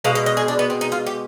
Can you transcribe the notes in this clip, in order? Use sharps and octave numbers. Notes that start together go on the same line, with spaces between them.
B2 G#3 F5
D#5
D#5
G#4
D4
B3
C4
D#4
F4
G4